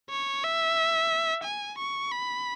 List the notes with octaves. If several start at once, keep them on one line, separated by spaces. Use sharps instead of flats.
C#5
E5
G#5
C#6
B5